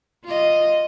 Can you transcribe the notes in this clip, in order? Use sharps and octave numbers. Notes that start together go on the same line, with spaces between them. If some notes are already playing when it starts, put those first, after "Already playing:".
F4 D#5